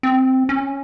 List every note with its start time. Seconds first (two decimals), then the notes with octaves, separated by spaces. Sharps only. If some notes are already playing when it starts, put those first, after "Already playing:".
0.03 C4
0.49 C#4